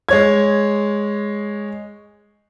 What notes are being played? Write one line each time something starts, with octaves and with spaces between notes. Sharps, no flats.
G#3 C#5 G#6